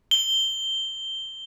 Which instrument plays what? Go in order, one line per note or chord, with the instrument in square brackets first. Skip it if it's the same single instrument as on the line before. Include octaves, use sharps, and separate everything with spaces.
[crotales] G7